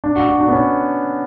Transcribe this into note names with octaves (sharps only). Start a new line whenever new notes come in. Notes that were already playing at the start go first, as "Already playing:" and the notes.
D4
F#4
F#4
D4
B3
C#4